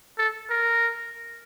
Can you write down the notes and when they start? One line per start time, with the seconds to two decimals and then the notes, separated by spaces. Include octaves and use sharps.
0.18 A4
0.50 A#4